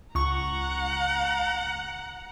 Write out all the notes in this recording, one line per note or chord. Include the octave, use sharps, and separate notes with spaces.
C#2 F#5 A#5 C#6